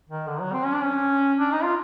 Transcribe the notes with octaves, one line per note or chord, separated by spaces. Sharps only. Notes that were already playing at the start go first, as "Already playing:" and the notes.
D#3
D3
F#3
C4
C#4
D4
C#4
D4
D#4
F4